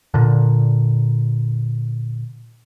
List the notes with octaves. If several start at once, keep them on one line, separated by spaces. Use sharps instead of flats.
A#2 D3